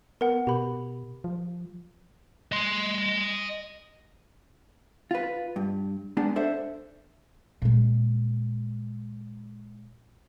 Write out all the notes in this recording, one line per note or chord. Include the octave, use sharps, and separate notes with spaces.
B3 A#4 F#5
B2 G4 B5
F3
D#5 C6
F4 B4
G2
G#3 B3 D4 G#4
D4 A4 C5 E5
A#2 G#3